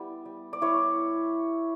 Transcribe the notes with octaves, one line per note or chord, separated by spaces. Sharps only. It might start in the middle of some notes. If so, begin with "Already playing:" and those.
Already playing: G3 B3 E4
G3
D5
E4 C#5